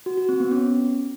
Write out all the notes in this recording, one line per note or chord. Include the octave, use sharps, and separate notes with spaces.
F#4
F#4
C4
B3
C#4